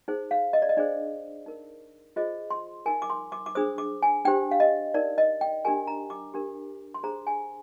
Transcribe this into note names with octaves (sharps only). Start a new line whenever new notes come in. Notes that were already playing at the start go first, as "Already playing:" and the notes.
D#4 G#4 C5
F5
D#5
D5
D#5
D4 G#4 C5 D5
D#4 A#4
F4 G#4 C5 D#5
C6
D#4 A#4 G#5
D6
C6
D6
D6
D4 G#4 C5 D#6
D6
G#5
D4 G4 C5 G5
F5
D#5
D#4 A#4 D5
D#5
G5
D4 G4 A#4 G#5
A#5
D6
D4 G4 A#4
C6
D4 G#4 C5 A#5
G#5